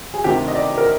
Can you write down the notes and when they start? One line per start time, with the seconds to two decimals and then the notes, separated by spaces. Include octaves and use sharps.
0.14 G#4
0.24 D2 C3 D#3 G4
0.48 D#5
0.55 D5
0.78 A#4